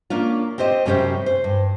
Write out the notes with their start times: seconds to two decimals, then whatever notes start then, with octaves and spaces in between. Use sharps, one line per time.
0.10 A#3 C#4 D4 F4
0.58 C4 G4 C5 D#5
0.86 F#2 C3 G3 C#4 G4 C5
1.26 C5
1.44 G2